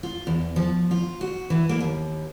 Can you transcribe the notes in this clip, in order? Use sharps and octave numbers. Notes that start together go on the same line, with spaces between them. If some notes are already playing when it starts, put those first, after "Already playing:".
F4
E2
F3
F4
F#4
E3
A#3
D#2